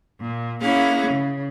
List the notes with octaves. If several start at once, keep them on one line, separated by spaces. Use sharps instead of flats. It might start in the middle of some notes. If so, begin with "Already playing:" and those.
A#2
A#3 C#4 E4 G#4 F5 F#5
C#3